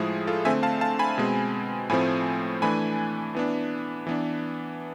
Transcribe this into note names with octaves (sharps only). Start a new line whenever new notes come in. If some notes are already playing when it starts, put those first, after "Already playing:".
Already playing: A2 F3 G#3 E4 G#4
F4 A4
D3 A3 C4 E5 G#5
F5 A5
F5 A5
G#5 B5
B2 G#3 C4
A2 F3 A3 C4 G#5 B5
E3 A3 D4 G#5 B5
E3 B3 D4
E3 B3 D4